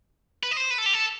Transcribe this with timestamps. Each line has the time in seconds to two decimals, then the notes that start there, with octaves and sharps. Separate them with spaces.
0.43 B4
0.51 D#5
0.57 C5
0.71 B4
0.78 A4
0.86 G4
0.94 A4